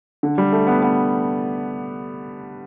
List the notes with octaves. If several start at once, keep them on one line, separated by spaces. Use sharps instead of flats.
D3
G3
A3
B3
B3